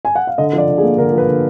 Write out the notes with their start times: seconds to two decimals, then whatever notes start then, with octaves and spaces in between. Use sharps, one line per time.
0.05 G#5
0.15 F#5
0.27 F5
0.38 D3 D#5
0.53 F3 D5
0.68 D3
0.78 G#4
0.83 A#3
0.98 D3 A#4
1.13 F3 B4
1.28 D3